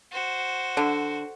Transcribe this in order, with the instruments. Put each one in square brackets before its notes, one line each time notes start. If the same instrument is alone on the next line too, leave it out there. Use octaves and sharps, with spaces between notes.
[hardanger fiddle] F#4 C5
[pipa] D3